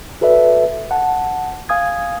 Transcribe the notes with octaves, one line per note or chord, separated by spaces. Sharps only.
F#4 A4 B4 D5 E5
F#5 A5
F5 G#5 D#6 G#6